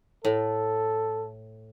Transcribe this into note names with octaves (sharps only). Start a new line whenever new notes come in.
A2 A4